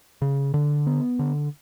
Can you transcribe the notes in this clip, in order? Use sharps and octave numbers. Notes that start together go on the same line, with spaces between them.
C#3
D3
B3
D3